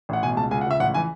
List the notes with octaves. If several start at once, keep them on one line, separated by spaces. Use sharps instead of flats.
A1 F#5
B2 G#5
C#2 A5
C#2 G#5
F#5
C#2 E5
A1 F#5
E3 G#5